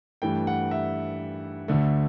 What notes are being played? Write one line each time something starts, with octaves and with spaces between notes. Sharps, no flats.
G2 E3 A3 G5
F#5
E5
D2 D3 A3